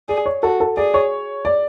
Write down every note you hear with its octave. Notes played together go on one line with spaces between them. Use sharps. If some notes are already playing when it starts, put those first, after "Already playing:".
G#4 D5
C#5
F#4 A4
A4
G#4 D5
C#5
D5